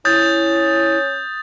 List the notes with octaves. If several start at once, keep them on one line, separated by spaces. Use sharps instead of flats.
C#4 E4 D#6 G6 A6